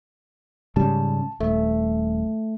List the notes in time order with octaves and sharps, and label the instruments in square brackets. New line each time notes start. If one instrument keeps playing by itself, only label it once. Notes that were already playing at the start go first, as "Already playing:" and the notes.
[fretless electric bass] G#2 C#3 G3 [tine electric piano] A5
[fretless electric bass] D#1 [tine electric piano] A3